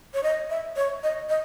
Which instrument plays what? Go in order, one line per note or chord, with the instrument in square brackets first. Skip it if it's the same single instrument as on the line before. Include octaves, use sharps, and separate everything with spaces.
[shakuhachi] C#5
D#5
E5
C#5
D#5
D#5